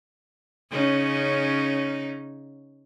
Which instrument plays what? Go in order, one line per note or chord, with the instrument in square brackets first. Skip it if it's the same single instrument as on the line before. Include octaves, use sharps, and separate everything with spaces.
[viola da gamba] C#3 C#4 D#4